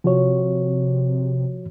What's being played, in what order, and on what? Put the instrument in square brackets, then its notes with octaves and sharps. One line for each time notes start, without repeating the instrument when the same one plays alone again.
[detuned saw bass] C3 [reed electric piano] F3 F#4 C#5